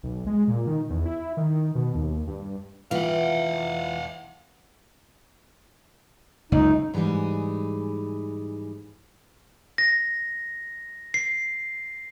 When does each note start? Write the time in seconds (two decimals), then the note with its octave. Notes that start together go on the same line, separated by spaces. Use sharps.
0.03 B1
0.27 G#3
0.48 A#2
0.67 D#3
0.90 E2
1.06 E4
1.37 D#3
1.75 B2
1.95 D#2
2.27 G2
2.91 E3 F4 F5 F#5
6.52 F#1 C#2 A2 D#4
6.93 G#2 E3 G3 D#4 G#4
9.78 A#6
11.14 C7